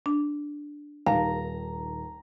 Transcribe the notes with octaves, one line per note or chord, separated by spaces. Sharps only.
D4
D#1 D#2 F5 A#5